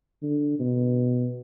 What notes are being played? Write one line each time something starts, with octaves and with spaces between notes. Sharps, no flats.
D3
B2